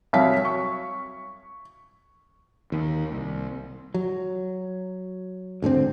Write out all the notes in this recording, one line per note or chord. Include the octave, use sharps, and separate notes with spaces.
C2 F#3 C#5 F5 B6
C#6
D#2
C2
F#3
D2 G#2 D3 C4